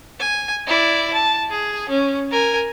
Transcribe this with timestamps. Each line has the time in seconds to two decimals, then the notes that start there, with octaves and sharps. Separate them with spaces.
0.19 G#5
0.67 E4 D5
1.13 A5
1.50 G#4
1.89 C#4
2.31 A#4 G#5